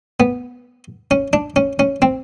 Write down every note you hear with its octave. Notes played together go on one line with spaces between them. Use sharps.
B3
C#4
D4
C#4
C#4
C4